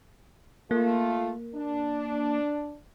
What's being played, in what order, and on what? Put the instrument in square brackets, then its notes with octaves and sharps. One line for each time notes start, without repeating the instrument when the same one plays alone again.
[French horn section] A3 F4 [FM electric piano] A#3
[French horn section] D4